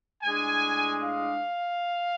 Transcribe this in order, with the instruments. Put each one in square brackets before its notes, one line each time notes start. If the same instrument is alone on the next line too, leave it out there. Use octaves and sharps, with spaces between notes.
[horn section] A2 G#3 D4 G#5
F5